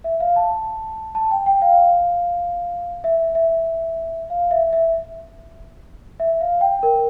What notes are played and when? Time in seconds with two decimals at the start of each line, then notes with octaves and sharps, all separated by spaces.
0.04 E5
0.20 F5
0.36 A5
1.15 A5
1.31 G5
1.46 G5
1.62 F5
3.04 E5
3.35 E5
4.30 F5
4.51 E5
4.73 E5
6.20 E5
6.41 F5
6.61 G5
6.83 A#4